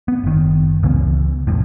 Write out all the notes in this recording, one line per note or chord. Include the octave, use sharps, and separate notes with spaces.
B3
F#1 D#3
C#2 C#3 E3 B3
C2 F2 A2